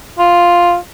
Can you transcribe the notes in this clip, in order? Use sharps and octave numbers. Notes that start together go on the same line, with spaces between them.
F4